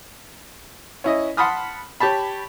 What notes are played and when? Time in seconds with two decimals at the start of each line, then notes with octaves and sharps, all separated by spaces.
1.04 C#4 E4 D#5
1.37 F#5 A5 B5 C6 D#6 F6
2.00 G4 C#5 A5 B5